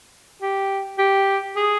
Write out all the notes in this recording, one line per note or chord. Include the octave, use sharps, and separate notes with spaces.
G4
G4
G#4